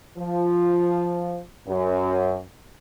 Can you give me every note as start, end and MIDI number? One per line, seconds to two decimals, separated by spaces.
0.18 1.39 53
1.67 2.40 42